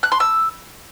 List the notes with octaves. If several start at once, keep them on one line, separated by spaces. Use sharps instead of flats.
F#6
C6
E6